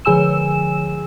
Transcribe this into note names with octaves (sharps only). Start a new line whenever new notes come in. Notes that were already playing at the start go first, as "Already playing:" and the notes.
D3 F3 G#4 G#5 E6 E7